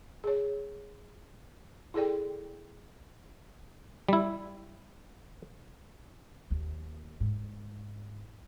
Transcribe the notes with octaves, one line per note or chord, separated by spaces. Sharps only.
G#4 C#5
E4 G#4 A4 D5 G5
G3 E4
D#2
G#2